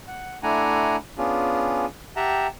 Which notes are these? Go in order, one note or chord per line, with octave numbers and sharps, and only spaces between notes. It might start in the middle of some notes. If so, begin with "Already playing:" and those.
F#5
A3 D4 E4 F#5 G#5 A#5
B3 C#4 D4 F4 G#4
G4 E5 F#5 G5 A5 A#5